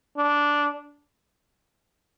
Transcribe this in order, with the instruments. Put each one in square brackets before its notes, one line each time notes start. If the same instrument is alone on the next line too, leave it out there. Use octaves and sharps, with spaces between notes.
[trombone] D4